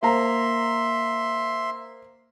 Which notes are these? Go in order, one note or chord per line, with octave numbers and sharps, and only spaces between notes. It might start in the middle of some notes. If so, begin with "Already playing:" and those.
A#3 C5 E5 A#5 C6